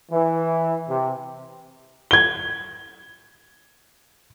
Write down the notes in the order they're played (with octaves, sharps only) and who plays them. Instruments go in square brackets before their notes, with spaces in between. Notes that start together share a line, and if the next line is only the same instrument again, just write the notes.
[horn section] E3
C3
[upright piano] G#6 G7